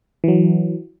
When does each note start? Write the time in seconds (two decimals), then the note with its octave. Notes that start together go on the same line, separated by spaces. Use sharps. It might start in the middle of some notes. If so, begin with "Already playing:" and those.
0.24 E3 F#3